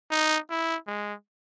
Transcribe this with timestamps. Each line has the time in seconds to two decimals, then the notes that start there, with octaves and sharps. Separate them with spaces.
0.11 D#4
0.50 E4
0.87 G#3